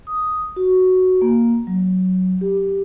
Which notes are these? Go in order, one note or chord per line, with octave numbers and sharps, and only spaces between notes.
D#6
F#4
A#3
F#3
G4